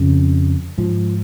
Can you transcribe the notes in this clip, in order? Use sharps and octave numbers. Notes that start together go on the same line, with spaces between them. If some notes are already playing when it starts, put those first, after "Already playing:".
Already playing: F2 C#3
G#2 F3